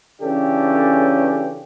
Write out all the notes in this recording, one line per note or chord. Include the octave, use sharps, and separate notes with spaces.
C#3 E3 C#4 D4 G4 A4